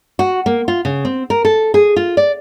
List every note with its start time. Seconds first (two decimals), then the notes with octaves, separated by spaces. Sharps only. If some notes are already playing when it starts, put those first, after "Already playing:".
0.19 F#4
0.46 A#3
0.68 F4
0.85 C#3
1.05 C4
1.30 A#4
1.45 A4
1.74 G#4
1.96 F4
2.17 D5